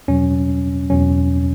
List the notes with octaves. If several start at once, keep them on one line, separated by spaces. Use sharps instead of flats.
E2 B2 F#3 C#4
E2 B2 F#3 C#4